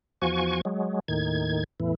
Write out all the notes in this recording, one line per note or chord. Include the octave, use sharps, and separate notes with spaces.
E2 F3 F#4 G#5 C#6
F#3 G#3
D#2 A2 D#3 G#6
E2 A2 E3